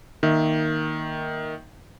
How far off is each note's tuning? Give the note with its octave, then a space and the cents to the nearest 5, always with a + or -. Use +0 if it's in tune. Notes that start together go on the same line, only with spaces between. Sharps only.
D#3 +0 A#3 +5 E5 -15